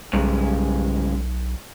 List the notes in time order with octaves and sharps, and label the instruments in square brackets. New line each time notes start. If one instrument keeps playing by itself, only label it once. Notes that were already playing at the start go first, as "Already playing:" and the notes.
[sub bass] B1 [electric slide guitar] G2 C#3 G#3